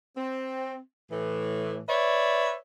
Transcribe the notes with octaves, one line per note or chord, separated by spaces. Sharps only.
C4
A2 E3
B4 C#5 D5 E5